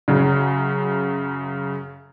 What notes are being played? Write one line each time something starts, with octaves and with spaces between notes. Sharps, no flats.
F#2 C#3